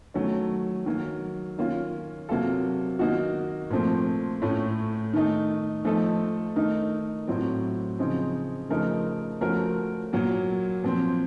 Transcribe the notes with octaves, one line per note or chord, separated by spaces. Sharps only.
D#3 F#3 A3 C#4 A4
D#3 F#3 A#3
D#3 A#3 C#4 F4
C3 F#3 A#3 F4 A4
D#3 A#3 D#4 F#4
A#2 F3 A3 C4
A2 A3 C#4
D#3 A3 D#4
F3 A3 D#4 A4
D#3 A3 D#4 A#4
A2 F#3 C4
C#3 F3 C4 D#4
C#3 F3 A3 D#4 A#4
F3 A3 C#4 F#4 A#4
A#2 F#3 A#3
A#2 F3 C4